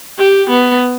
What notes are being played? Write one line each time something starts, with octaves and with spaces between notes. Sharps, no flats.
G4
B3